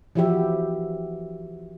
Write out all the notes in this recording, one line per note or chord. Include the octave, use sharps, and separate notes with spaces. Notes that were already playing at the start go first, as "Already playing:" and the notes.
E3 F3 E4 F#4 G4 E5